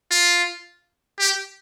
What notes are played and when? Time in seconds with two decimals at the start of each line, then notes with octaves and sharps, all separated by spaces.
0.11 F4
1.19 G4